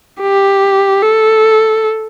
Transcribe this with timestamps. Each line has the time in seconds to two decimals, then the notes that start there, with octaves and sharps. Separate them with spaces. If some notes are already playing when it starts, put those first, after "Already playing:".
0.22 G4
1.02 A4